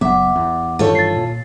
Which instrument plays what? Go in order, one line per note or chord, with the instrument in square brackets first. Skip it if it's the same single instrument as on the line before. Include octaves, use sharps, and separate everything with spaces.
[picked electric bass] F#1 F#3 B3 [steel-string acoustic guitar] E5 [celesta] F#5 D6
[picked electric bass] E2
[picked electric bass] G2 D#3 E3 [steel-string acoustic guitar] F4 A4 C#5
[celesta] A6 C7
[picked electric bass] A#2